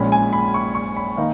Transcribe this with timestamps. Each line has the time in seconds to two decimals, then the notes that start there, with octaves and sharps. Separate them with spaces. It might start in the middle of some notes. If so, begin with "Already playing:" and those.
Already playing: A#1 A#2 G#3 C#4 B5
0.12 G#5
0.33 B5
0.54 C#6
0.75 C#6
0.96 B5
1.17 D#3 A#3 D#4 F5